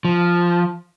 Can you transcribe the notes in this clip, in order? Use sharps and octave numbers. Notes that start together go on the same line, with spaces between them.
F3